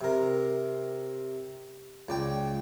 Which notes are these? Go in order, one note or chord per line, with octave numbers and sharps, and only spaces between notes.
C3 A#4
C#2 D5 G5